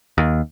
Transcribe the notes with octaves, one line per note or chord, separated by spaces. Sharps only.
D#2